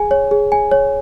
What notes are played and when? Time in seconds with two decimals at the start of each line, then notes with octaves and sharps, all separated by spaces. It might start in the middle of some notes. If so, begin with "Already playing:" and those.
Already playing: G#4 G#5
0.11 C#5
0.31 G#4
0.52 G#5
0.72 C#5